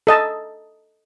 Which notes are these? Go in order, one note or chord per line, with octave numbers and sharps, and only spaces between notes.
A4 D#5 A5